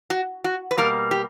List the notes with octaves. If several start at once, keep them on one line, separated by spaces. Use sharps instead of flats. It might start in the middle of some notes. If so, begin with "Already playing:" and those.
F#4
F#4
B4
B2 G3 A#3 A#4
G4